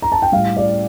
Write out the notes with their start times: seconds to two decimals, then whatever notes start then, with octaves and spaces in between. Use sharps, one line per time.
0.02 A#5
0.12 A5
0.22 G5
0.32 A2 G3 F5
0.57 D5